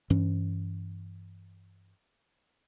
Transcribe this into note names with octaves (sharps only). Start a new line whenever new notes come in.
G2 E3 C#4